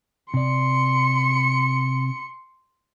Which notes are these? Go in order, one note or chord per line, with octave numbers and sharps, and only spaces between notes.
C3 D5 C6 C#7